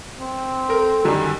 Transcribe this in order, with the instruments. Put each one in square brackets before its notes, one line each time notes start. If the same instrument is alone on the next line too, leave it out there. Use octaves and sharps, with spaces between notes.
[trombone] C4
[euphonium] A4 [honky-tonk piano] A#4
[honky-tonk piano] F#2 D3 G3 [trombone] D#3